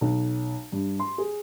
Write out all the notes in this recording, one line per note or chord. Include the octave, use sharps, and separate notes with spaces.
B1
G2
C6
G#4